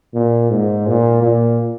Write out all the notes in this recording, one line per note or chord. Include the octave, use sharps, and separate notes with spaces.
A#2
G#2
A#2
A#2